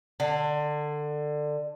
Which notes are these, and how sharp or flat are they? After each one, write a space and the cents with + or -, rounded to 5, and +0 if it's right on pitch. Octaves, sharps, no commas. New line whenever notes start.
D3 +20